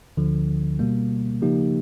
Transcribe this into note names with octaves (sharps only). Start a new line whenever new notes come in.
D2 D3 F3
B2 G3 A#3
C#3 F3 A#3 D#4 G4